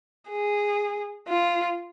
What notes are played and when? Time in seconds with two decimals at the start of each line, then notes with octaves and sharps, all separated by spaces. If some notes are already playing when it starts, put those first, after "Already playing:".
0.29 G#4
1.29 F4